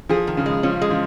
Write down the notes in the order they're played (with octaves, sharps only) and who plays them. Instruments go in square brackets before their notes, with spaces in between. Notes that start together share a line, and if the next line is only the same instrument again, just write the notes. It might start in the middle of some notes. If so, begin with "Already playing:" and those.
[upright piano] F3 [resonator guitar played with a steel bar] G#4
[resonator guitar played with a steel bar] D#3
[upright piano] C#3
[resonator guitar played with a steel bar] G#3
[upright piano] F3 [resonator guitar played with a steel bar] C#4
[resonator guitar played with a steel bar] G#3
[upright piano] F3